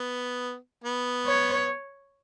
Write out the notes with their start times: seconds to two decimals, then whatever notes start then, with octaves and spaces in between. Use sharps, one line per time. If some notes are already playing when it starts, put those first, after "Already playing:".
Already playing: B3
0.84 B3
1.26 C#5